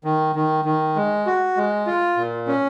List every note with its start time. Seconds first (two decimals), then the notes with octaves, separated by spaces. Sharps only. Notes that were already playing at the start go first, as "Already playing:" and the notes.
0.04 D#3
0.36 D#3
0.65 D#3
0.96 G#3
1.26 F#4
1.57 G#3
1.86 F4
2.17 A#2
2.47 C#4